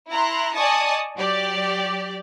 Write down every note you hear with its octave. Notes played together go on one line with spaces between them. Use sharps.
E4 A#5 C6 F#6
D5 D#5 G#5 A5 C#6 D#6
F#3 G4 D5